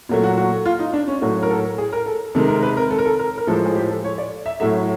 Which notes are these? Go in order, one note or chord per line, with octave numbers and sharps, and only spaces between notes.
A#2 F#3 A3
F#4
F#4
F4
D#4
D4
C#4
A2 F#3 A3 F#4
A#4
A4
G#4
A#4
A4
C3 D#3 G#3 A4
A#4
B4
A#4
A4
A#4
A4
A#4
A#4
A2 F3 G#3 A4
G#4
G4
A4
C#5
D5
E5
A2 F#3 A3 E5